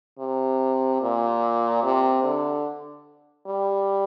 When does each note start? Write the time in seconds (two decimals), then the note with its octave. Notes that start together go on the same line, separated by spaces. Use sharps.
0.19 C3
1.02 A#2
1.83 C3
2.24 D3
3.46 G3